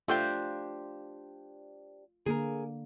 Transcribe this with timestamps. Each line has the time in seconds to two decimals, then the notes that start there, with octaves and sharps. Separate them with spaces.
0.08 A3 D4 F4 G4 C5 G5
2.26 D3 A#3 G#4 A#4